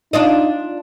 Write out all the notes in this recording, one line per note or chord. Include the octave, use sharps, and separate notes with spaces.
D4 D#4 F4 D#5